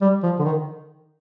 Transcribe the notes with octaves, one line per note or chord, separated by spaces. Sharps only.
G3
F3
D3
D#3